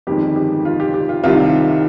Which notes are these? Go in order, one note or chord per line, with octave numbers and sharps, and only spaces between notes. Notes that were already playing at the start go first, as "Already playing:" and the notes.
G1 F2 D#3 G#3 G4
G4
F4
G4
G4
F4
C2 C3 D#3 G3 F4